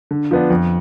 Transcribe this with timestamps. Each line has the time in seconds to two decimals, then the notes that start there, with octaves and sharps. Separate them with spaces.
0.11 D3
0.31 F3 B3 D4
0.50 F2